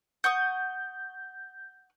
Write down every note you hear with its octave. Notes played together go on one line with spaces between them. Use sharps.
F#5 C#6 D#6 G6